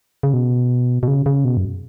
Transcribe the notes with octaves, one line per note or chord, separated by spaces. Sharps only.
C#3
B2
B2
C#3
C#3
B2
F#2